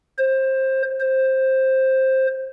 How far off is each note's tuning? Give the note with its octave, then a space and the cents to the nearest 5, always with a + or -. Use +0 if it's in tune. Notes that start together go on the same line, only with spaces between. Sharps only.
C5 +20
C5 +10